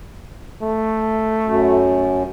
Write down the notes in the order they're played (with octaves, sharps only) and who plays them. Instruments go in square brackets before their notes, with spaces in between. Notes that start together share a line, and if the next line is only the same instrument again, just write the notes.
[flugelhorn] A3
[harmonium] F#2